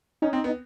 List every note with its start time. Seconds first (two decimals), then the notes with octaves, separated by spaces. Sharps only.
0.22 C#4 D#4
0.33 C4
0.44 B3